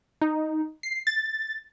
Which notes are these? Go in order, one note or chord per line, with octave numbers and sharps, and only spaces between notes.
D#4
C7
A6